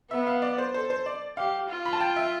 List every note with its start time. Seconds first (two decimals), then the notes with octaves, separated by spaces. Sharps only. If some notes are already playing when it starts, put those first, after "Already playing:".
0.11 B3 E5
0.27 F5
0.42 D5
0.58 C5
0.74 A4 C5
0.90 C5
1.06 D5
1.37 G4 F5
1.69 F4
1.86 B5
1.93 A5
2.00 G5
2.16 E5